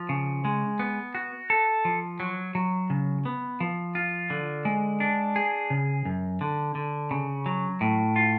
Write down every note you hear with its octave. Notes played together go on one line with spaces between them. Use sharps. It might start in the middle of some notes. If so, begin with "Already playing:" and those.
Already playing: F3
C#3
G#3
B3
F#4
A4
F3
F#3
F#3
C#3
B3
F3
F4
D3
G#3
D4
G#4
C#3
F#2
D3
D3
C#3
F#3
A2
F4